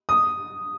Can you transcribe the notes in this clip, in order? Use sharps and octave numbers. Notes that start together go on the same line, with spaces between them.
D#6